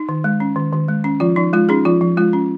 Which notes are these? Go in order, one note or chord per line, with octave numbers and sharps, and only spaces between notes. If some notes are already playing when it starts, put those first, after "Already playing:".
Already playing: D#4
D#3
G#3
C#4
D#3
D#3
G#3
C#4
F3 F4
F3 D#4
G#3 F4
C#4 D#4 G#4
F3 F4
F3
G#3 F4
C#4